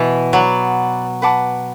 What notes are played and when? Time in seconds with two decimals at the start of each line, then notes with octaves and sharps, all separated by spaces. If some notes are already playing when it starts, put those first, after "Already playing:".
Already playing: B2 E3
0.33 F#3 B4 D5 F#5
1.22 B4 F#5 A5 D6